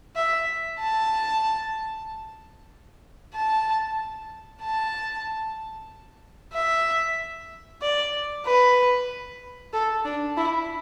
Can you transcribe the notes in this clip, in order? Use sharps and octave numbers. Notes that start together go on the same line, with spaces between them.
E5
A5
A5
A5
E5
D5
B4
A4
D4
E4